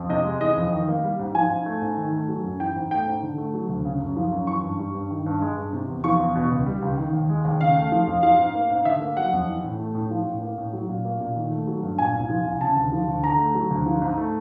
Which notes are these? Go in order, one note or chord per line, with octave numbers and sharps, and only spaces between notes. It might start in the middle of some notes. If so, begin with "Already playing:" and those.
Already playing: F2
C3 D#5
G#3
E3 D#5
F2
D#3
A#3
G3
G#2
F3 G#5
G#2
A3
G#2
D#3
A3
F#3
F#2
E3 G5
G#2
A3 G5
G#2
D3
A3
F#3
D2
C#3
F#2
F3
F#2
E3 C#6
G2
G3
G2
D#3
G2
G#3
G2
C3
E2
F3 C#6
E2
B2
C#2
G3
C#2
D#3
D#2
G#3
D#2
C#3 F5
A3
F3
F2
F3 F5
G#2
A#3
G#2
D3 E5
A#3
F#3 F#5
F2
E3
A2
A3
A2
F3
A2
A#3
A2
F#3
A#2
A#3
A#2
D#3
A3
F#3
G2
A#2 G#5
C2
F3
C2
C#3 A5
D2
F3
D2
D3 A#5
A3
F#3
D2
F3
G#2
A3